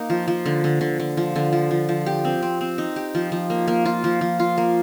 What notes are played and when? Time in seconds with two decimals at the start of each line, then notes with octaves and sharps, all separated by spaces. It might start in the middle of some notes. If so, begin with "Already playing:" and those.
Already playing: A#3 D#4
0.10 F3
0.28 F3
0.46 D3
0.64 D3
0.81 D3
1.00 D3
1.17 F3
1.36 D3
1.53 F3
1.71 F3
1.89 F3
2.06 G4
2.25 C4
2.42 C4
2.61 C4
2.78 D#4
2.96 G4
3.15 F3
3.32 F3
3.50 A#3
3.68 A#3
3.85 F4
4.04 F3
4.21 F3
4.40 F4
4.58 A#3